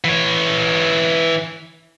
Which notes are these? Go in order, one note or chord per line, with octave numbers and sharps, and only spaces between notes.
E3 C#5